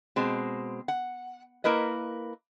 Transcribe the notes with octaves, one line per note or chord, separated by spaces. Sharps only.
B2 G#3 C4
F#5
A#3 E4 A#4 B4 D#5